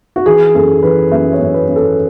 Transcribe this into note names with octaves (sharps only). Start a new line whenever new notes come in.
F#4
E3 G#4
F#2 A4
E3 B4
F#2 E5
C#5
F#2
B4
F#2
A4